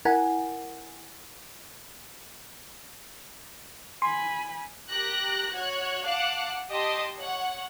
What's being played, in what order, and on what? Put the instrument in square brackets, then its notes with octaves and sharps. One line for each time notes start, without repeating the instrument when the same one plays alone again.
[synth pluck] E4 A#4 F#5 G#5 A#5
[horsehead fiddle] G#5 B5 [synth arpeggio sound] C6
[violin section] G4 A#4 F#6 A#6
F#4 C#5 F#6 G#6
F5 F#5 A5 D6 F#6
G4 D#5 A5 C6 D#6
C#5 F#5